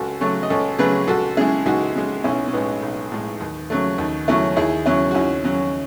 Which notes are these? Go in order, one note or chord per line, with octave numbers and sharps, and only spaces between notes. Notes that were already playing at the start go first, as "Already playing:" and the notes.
Already playing: C#2 F#4 A4
C#3 F#3 A3 A4 C#5
D#5
C#2 A4 C#5
C#3 F#3 A3 G#4 B4
C#2 F#4 A4
C#3 G#3 E4 G#4
C#2 D#4 F#4
C#3 G#3
B1 C#4 E4
C#4
A2 G#3 B3 D#4
B1
A2 G#3
D#2
C#3 F#3 A3
D#2
C#3 F#3 A3 C#4 E4
D#2 E4 G#4
C#3 F#3 C#4 E4
F#4
D#2 C#4 E4
C#3 F#3 C#4